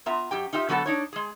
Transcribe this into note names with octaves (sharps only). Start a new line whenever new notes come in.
B3 F4 E5 A#5
F#2 G4 G5
D#4 F4 G4 E5
D3 F#3 B3 G#4 A4 F#5
D4 D#4 C#5
G#3 G#4